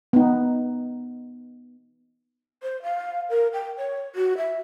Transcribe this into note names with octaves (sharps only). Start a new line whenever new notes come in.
B3 D#4
C5
F5
A#4
G5
C#5
F#4
E5